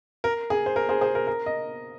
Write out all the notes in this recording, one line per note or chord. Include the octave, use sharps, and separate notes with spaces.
A#4
G#4
C5
A#4
G#4 C5
G#4 C5
A#4
A#4
D#5